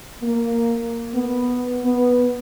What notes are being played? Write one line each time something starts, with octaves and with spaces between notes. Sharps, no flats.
A#3
B3
B3